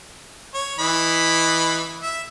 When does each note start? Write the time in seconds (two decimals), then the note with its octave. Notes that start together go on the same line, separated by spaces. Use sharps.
0.54 C#5
0.79 E3 D#5 B5
2.02 E5